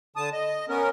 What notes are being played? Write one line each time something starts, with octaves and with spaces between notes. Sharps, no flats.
D3 A5 D#6
D#5
B3 C#4 A#4